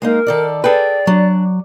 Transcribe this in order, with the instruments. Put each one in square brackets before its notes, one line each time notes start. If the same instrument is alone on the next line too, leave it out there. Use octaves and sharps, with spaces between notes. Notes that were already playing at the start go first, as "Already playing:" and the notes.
[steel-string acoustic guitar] G#3 A#3 D#4 [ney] A#4
[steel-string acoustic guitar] D#3 A4 D5
[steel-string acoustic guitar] G#4 G5 [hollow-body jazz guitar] A4 B4 [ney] D5
[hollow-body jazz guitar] F#3 [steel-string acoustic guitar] D4